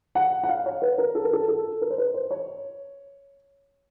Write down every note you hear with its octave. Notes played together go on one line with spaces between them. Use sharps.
F#5
F#5
F5
C#5
B4
A#4
A4
A#4
A4
A4
A#4
C5
B4
C5
C#5